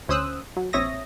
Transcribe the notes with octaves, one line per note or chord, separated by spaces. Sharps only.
D2 C#4 C5 D#6 E6 F#6
F#3
A#1 C4 C#5 E5 D#6 A#6